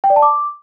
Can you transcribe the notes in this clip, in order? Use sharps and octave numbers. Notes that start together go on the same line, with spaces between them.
G5
D5
A5
D6